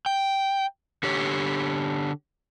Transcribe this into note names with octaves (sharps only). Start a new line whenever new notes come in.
G5
D3 G4 C#5